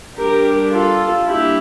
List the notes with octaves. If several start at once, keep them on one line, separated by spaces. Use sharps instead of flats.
G3 D4 G4 A#4
F4 A4
G3 A#3 D4 E4 G4